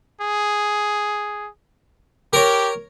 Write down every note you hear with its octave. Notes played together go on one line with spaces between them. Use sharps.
G#4
G4 A#4 C#5